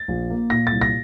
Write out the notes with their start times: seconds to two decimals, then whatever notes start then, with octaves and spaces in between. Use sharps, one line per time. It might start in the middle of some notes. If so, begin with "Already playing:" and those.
Already playing: A6
0.08 A#1
0.30 A#3
0.50 A#2 A#6
0.67 C2 A6
0.82 A#6